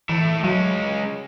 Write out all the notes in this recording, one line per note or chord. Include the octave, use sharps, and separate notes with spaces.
E3 A3 E4
F#3 G#3 C#4